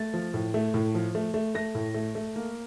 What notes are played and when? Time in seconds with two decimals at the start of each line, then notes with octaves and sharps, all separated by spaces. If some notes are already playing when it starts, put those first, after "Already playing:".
Already playing: A3 A6
0.14 F3
0.34 A2
0.54 A3
0.74 A2
0.95 F3
1.15 A3
1.34 A3
1.55 A3 A#6
1.75 A2
1.94 A3
2.15 A3
2.36 A#3